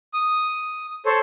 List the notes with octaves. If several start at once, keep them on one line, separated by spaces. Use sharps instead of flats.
D#6
A4 C5 C#5